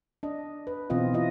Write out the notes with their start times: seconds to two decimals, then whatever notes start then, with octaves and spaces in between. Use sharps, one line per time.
0.23 D4 D#5
0.67 B4
0.90 B2 E3 C4 F4 D#5
1.14 E3 E4 F4 D#5